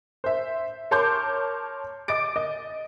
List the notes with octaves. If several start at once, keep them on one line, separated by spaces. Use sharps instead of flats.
C5 E5
A#4 C#5 A5 C6 D6 G6
D#5 D6 A6 D7
D#5